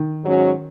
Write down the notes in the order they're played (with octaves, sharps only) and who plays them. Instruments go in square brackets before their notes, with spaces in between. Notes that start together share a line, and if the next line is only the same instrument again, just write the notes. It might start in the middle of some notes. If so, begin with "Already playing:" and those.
Already playing: [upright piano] D#3
[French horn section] G#2 F#3 C#4 F#4